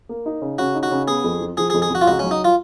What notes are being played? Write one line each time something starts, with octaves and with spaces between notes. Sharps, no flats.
A#3
D#4
C#3
C#3 F#4
D#4
F#4
C#3
B3 G#4
F2
F3
F3 G#4
G#4
F2
G#4
F2 F#4
F4
C#2 F#4
C#4
F#3
D#4
F4